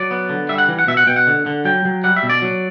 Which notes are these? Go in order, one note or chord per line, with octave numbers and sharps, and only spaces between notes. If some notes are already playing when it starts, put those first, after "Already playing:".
Already playing: F#3 D5
B3
D3
G3 E5
F#5
E3
F#5
B2 E5
F#5
B2 G5
F#5
D3
D3
F#3 G5
F#3
G3 F#5
E5
B2
D5
F#3